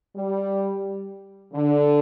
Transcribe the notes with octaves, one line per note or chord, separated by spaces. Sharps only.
G3
D3